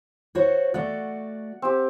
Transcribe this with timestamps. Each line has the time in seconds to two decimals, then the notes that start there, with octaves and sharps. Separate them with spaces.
0.35 F#4 C5 C#5
0.74 A3 F#4 D5 F#5
1.62 C4 G4